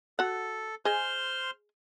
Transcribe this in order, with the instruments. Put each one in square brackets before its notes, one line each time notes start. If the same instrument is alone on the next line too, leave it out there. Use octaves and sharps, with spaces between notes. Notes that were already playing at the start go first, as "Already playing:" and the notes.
[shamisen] F#4 F#5 [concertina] A4
[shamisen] G#4 D#5 G#5 [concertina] C5 C6 F6